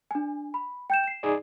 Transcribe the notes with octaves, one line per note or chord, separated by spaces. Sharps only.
D4 G#5
B5
G5 G6 E7
C7 E7
D#4 G#4 D5